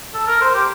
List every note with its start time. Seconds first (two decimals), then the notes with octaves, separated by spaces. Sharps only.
0.14 A4
0.28 A#4
0.41 C5
0.54 G4